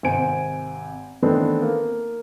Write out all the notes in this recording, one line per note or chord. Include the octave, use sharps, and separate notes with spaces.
G#1 C3 C5 G#5 D7
D#3 E3 A3 B3 C4 D4
A#3